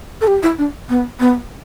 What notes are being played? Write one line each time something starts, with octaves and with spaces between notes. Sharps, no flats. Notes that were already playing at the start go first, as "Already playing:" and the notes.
A4
G4
E4
D4
B3
B3